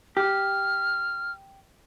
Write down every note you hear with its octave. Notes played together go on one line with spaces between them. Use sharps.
G4 F6